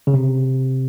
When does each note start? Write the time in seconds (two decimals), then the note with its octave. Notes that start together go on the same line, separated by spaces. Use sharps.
0.07 C#3
0.14 C3